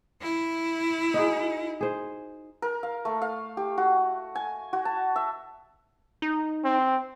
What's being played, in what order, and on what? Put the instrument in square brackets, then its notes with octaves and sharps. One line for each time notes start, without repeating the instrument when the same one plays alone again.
[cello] E4
[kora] D#4 F#4 G#4
G#4 C5
[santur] A#4
F5
A3
F5
G4
F#4
G#5
F#4
A5
E5
[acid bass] D#4
[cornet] C4